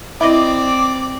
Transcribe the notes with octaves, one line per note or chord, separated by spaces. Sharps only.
C4 E4 D5 D#5 D6